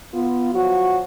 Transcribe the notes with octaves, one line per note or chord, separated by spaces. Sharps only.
B3 F4
F3 F#3 F#4